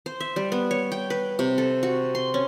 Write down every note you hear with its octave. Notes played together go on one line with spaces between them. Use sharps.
C5
E5
G3
B3
C#5
G5
B4
C3
A4
F#4
C6
C#4